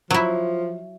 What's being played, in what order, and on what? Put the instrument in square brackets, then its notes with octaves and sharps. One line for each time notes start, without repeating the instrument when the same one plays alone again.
[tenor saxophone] F3 [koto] F#3 E4